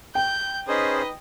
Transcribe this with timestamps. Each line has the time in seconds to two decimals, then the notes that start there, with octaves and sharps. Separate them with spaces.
0.15 G5 G6
0.68 C#4 D#4 G#4 B4 C5 D#5